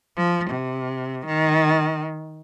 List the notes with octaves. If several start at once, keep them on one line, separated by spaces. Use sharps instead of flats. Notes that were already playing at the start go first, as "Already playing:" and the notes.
F3
C3
D#3